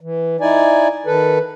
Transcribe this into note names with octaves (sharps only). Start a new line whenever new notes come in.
E3
D#4 E4 D5 G#5
D#3 A4 B4